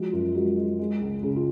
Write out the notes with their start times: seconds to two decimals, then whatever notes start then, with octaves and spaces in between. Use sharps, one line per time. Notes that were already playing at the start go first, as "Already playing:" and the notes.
Already playing: F3 G#3 F#4
0.12 F#2 F4
0.35 G#3 F#4
0.58 G#3
0.79 G#3
1.01 C#2
1.23 C#3 G#4
1.36 F4